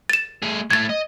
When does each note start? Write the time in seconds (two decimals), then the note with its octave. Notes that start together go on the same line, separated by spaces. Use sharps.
0.10 A6 E7
0.42 A3 G#4
0.70 A2 A3 G#6 A6
0.89 D#5